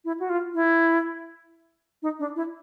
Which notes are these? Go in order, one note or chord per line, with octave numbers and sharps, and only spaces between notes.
E4
F#4
F4
E4
D#4
D4
E4